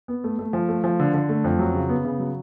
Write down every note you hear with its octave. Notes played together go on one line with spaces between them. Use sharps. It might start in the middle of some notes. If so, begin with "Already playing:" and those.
B3
A3
A3
F3
A3
F3
D3
D3
A3
F2
F#3
C#3
B3
C#3
F#3